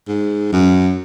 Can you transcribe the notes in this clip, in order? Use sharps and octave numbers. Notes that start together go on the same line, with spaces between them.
G#2
F#2